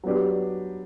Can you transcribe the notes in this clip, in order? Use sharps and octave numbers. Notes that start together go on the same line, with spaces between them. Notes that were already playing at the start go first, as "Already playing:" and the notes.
F#3 B3 D4 G4